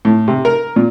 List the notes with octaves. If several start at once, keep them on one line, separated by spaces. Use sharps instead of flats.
A2
C3
A#4
A#2